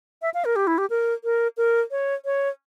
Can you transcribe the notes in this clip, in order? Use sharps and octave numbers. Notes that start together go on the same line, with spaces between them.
E5
F5
A#4
G4
E4
G4
A#4
A#4
A#4
C#5
C#5